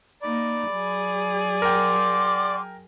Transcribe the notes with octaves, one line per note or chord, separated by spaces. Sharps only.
A#3 D#4 D5 B5
F#3 G#4
A#4 F#5 G5 C6 D6